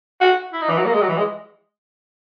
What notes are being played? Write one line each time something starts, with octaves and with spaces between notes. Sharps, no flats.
F#4
E4
D#4
E3
F#3
A#3
G#3
F#3
E3
G#3